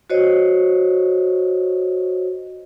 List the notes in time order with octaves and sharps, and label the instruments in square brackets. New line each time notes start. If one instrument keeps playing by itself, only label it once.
[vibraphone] F#4 C5 C#5 D#5